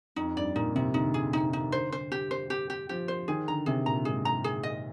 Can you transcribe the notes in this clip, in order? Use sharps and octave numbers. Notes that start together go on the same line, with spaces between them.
F2 D#4
G2 D5
A#2 D#4
C3 D#4
D3 D#4
G#4
C3 D#4
D#4
D3 C5
C5
G4
C5
G4
G4
F3 G4
C5
D#3 G#4
D3 A#5
C3 G#4
A#2 A#5
G#2 G#4
A#5
G#4
D#5